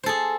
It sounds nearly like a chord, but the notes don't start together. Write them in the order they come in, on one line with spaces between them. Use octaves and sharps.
C5 A4 G#4